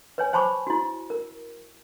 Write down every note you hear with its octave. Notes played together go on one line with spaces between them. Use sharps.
B4 C#5 G#5
C5 G#5 A5 B5 C#6 D6
E4 F#4
A#4